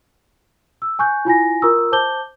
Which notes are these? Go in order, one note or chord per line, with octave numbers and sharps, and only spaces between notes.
E6
G#5 C#6 F#6 G6
E4 F4 G#5 A#6
F4 A#4 A#5 C#6 D#6 E6
C5 A5 D6 G6 G7